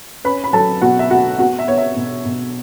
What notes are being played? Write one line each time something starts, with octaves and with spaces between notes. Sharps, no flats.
C#4 B4 B5
B5
F#3 A4 A5
B2 F#4 F#5
E5
A3 F#4 F#5
B3 F#4 F#5
E5
B3 C#5
E5
B2
B2